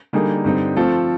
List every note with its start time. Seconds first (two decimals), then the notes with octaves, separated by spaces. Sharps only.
0.13 D3 G3 A#3 D#4 G#4
0.45 G2 D3 G3 C4 D#4
0.76 F3 A3 C4 F4 A4